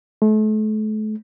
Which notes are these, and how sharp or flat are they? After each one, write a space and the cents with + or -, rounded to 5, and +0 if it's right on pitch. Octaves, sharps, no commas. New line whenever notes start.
A3 -40